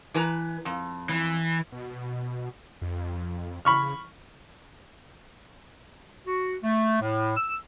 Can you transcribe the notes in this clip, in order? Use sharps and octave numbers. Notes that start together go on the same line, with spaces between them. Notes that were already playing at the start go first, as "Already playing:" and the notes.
E3 B4 A#5
F2
E3
B2
F2
C#3 B5 C#6 F6
F#4
A3
A2
E6